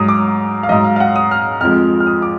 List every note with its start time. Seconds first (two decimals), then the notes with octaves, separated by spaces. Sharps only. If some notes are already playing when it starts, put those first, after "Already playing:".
Already playing: G#2 F#3 D#6
0.08 D6
0.63 F5
0.69 G#2 F#3 D#5
0.84 F5
0.96 F5
1.00 F#5
1.16 D#6
1.31 F6
1.61 F2 F3 G#3 F6
2.00 F6
2.07 D#6
2.22 D6